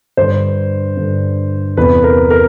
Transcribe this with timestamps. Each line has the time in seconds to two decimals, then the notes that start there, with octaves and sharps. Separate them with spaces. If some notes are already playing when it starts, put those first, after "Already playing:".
0.17 G2 D3 C5
0.97 G2 D3
1.77 E2 C3 E3 B4
2.04 A#4
2.30 A#4